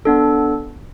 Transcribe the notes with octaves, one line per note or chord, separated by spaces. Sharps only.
B3 D4 A4